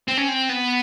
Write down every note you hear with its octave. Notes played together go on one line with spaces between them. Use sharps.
C4
C#4
C4
B3